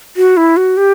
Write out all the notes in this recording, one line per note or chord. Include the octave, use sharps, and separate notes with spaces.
F#4
E4
F#4
G4